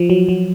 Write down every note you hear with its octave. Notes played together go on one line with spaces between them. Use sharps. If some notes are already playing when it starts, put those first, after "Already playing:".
Already playing: F3
F#3
F#3